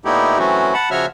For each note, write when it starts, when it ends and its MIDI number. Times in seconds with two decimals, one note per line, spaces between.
0.05 0.38 46
0.05 0.38 57
0.05 0.38 59
0.05 0.38 63
0.05 0.38 64
0.05 0.38 67
0.39 0.74 52
0.39 0.74 54
0.39 0.74 57
0.39 0.74 60
0.39 0.74 61
0.39 0.74 66
0.74 0.89 78
0.74 0.89 81
0.74 0.89 83
0.91 1.06 49
0.91 1.06 53
0.91 1.06 66
0.91 1.06 73
0.91 1.06 76
0.91 1.06 89